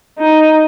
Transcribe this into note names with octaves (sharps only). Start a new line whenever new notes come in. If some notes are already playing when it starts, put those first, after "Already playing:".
D#4